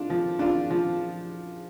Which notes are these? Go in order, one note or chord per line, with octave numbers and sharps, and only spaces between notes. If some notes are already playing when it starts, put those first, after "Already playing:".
Already playing: D4 F4
F3
D4 F4
F3